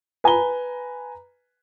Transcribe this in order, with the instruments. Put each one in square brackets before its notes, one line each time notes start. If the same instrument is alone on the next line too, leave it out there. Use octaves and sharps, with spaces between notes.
[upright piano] B4 G#5 A#5 B5 G7